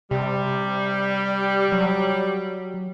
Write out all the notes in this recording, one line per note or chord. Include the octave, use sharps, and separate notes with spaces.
C3 G3
F#3